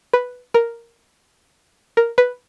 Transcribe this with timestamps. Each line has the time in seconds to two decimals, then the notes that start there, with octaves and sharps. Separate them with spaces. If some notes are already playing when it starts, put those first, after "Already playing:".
0.13 B4
0.54 A#4
1.97 A#4
2.18 B4